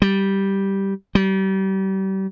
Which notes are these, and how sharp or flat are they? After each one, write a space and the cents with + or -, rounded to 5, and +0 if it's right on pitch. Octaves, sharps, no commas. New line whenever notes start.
G3 -5
G3 -35